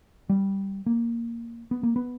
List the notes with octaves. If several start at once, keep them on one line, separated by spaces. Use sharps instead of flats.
G3
A#3
B3
A#3
B3